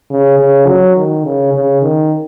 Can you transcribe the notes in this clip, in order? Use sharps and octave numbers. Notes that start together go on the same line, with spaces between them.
C#3
C#3
F#3
D#3
C#3
C#3
D#3